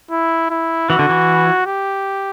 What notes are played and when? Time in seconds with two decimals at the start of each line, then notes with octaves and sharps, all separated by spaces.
0.11 E4
0.50 E4
0.89 E3 F#4
0.99 D3
1.09 E3
1.66 G4